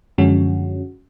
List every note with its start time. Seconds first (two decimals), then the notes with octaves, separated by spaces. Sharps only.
0.18 F#2 D3 F3 G#3 C#4 F#4